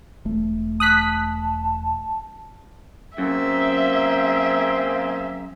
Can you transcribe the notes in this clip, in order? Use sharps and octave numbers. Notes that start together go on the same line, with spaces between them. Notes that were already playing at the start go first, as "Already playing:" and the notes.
E1 A3
A5 D#6 F#6 B6
F#2 A#3 C4 G#4 E5